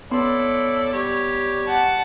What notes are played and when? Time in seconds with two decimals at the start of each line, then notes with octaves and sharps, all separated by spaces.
0.11 B3 E4 A4 C#5 D5 C6
0.93 G3 G4 C#5
1.68 F#5 A5